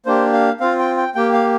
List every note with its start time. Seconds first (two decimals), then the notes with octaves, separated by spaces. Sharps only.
0.06 A#3 D4 G4 C5
0.33 F5
0.60 C4 F4 F5
0.79 G5
0.97 G5
1.15 A#3 G4 G5
1.33 F5